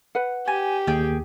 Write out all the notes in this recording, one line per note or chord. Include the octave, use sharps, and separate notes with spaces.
B4 F#5
G4 G#5
D#2 G#4 G5